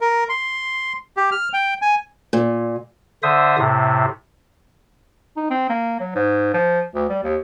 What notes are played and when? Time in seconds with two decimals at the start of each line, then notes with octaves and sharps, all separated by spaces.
0.01 A#4
0.29 C6
1.17 G4
1.32 F6
1.53 G5
1.82 G#5
2.33 A#2
3.23 D3 C5 E5 D#6
3.58 A2 C3
5.37 D#4
5.51 C4
5.70 A#3
6.00 F#3
6.15 G#2
6.54 F3
6.95 D2
7.09 G3
7.23 D#2